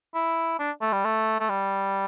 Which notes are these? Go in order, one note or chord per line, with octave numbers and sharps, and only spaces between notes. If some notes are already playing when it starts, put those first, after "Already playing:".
E4
D4
A3
G3
A3
A3
G3